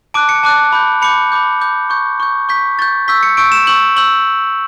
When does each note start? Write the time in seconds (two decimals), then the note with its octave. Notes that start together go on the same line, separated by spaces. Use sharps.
0.14 A5 D6 F#6 D7
0.29 C#7
0.43 A5 D6 F#6
0.72 B5 D6 G6
1.02 B5 D6 G6 C#7
1.32 B5 D6 G6
1.61 B5 D6 G6
1.90 C#6 G6
2.20 C#6 G6
2.49 C#6 G6 B6
2.79 C#6 G6 A6
3.08 C#6 E6 G6 B6
3.23 C#7
3.37 C#6 E6 G6 D7
3.52 E7
3.67 C#6 E6 G6 F#7
3.96 C#6 E6 G6 F#7